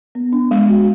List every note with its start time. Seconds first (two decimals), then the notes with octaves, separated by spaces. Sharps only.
0.15 B3
0.33 D4
0.51 G#3
0.69 F#4